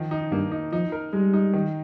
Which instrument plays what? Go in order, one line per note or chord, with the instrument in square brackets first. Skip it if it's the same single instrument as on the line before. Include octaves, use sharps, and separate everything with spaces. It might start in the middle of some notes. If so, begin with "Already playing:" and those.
Already playing: [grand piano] D#3 F3
D#4
[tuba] G2 [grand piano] A#3
[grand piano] D#4
[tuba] F3 [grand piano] D#4
[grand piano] A#4
[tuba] G3 [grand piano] G#3
[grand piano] D#4
D#3